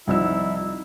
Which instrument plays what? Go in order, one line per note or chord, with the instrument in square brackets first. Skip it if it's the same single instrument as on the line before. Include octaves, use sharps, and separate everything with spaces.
[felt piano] C2 D#4 E6 [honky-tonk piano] F3 C4 [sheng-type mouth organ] E4